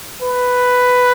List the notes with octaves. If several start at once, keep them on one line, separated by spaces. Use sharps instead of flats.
B4